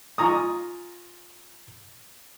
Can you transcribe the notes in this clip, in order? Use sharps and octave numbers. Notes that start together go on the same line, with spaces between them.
F4 G#5 A#5 C#6 D#6